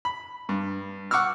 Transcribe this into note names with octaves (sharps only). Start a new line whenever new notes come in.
B5
G2
F#5 C#6 D6 E6 F6